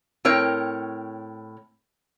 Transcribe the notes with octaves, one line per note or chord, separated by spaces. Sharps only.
A2 C4 A#4 C#5 G5